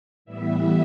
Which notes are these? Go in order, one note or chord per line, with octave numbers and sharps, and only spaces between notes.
A2 E3 G3 B3 E5